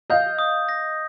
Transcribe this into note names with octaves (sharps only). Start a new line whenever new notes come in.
D#5 F5 G6
D#6
A#6